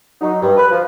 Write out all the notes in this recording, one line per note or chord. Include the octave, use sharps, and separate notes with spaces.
F#3 D#4
G2
B4
F3